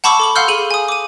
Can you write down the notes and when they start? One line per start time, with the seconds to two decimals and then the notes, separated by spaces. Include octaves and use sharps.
0.04 F#5 A5 B5 C#6 D6 E6
0.20 A4 D6 F#7
0.35 F5 F#5 C6 E6 F6 G6
0.48 G#4 D#7 F#7
0.71 G#5 D#6
0.89 D6 D#7